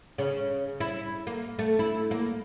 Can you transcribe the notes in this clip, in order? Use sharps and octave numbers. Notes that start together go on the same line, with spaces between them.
C#3
E4
A#3
A3
E4
A#3